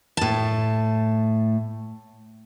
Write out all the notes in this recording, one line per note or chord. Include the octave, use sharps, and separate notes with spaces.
A2 A5